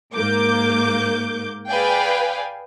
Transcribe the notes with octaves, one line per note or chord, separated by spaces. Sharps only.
G#2 A#3 D6 G6
G#4 B4 D5 F5 G5 G#5